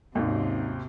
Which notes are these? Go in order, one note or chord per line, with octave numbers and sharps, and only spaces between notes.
G#1 D#2 C3 F#3 C#4 D#4